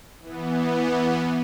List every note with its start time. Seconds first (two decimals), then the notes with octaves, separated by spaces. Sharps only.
0.20 E3 B3